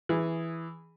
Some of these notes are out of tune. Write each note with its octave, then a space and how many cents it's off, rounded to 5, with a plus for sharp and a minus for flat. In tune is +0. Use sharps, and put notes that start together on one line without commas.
E3 +0 G#4 +0